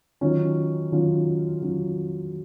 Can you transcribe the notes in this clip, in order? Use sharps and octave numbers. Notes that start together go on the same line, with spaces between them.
D#3 F#3 C#4 F4
D#3 F#3 C#4 F4
D#3 F#3 C#4 F4